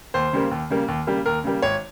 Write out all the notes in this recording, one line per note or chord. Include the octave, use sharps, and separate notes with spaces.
D#2 C5
C#3 G3 A#3
D#2
C#3 G3 A#3
D#2
C#3 G3 A#3
D#2 A#4
C#3 G3 A#3
G#1 C#5